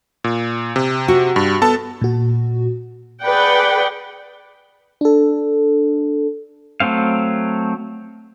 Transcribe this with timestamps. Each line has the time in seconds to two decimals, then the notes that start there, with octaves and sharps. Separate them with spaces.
0.24 A#2
0.76 C3
1.08 F#4
1.36 G2
1.62 B3 A4 A5
2.02 A#2 F#4
3.22 G#4 B4 D5 F#5 G5
5.01 D4 A4
6.80 F#3 A3 C4 F5